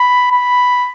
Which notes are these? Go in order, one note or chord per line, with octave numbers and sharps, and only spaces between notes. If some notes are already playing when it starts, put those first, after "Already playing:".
Already playing: B5
B5